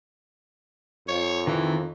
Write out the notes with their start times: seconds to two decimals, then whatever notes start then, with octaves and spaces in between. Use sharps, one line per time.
1.08 F2 C#5
1.47 D#3 E3 C4